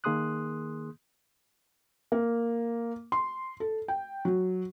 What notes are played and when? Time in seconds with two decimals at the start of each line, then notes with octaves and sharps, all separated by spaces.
0.04 D#3 A#3 G#4 C6 D#6 F#6
2.12 A#3
3.12 C6
3.60 A4
3.88 G5
4.25 F#3